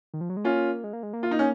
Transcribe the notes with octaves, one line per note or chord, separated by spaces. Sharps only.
D#3
F3
F#3
G#3
A#3 C#4 F4
G#3
A#3
G#3
A#3
F4
D#4
C#4